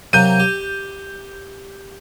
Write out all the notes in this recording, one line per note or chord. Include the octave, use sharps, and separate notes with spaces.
C3 F#3 A#3 G6 D#7
G4